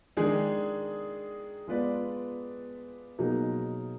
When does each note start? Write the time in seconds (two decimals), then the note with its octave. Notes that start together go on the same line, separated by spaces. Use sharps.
0.17 D#3 G#3 D4 G#4
1.68 G#3 B3 F4 B4 D5
3.19 B2 F#3 A#3 D#4 G#4